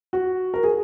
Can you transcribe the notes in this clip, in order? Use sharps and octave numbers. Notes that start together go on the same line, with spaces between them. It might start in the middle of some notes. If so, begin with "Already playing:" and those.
F#4
A#4
G#4